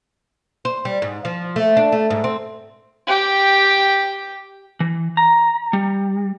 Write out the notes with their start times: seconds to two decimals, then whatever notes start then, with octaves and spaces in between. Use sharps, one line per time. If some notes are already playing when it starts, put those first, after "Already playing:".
0.65 C5
0.85 G3
1.02 G#2
1.25 F3
1.56 A3
1.77 D4
1.92 A3
2.10 G#2
2.24 C4
3.07 G4 G5
4.80 E3
5.17 A#5
5.73 G3